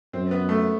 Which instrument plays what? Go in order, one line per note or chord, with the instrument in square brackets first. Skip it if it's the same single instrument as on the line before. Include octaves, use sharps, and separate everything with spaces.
[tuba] F#2 [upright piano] C4
[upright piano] B3
A3